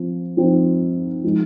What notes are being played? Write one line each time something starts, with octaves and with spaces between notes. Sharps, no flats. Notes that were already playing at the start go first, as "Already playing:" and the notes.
Already playing: F3 C4
F3 C4 D#4
F3 G#3 D#4